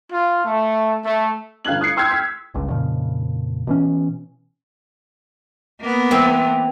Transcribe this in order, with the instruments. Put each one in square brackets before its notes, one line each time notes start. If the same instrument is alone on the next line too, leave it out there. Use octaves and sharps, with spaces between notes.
[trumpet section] F4
A3
A3
[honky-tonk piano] G1 F5 F#6 G#6 F#7
D#6 F#6 G#6 C7 C#7
G5 C6 E6 F6 G6 G#6
B6
[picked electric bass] G1 C#2 C#3
F2 A#2 C#3 F3
B2 E3 C#4
[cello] A#3 B3
[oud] E3 C4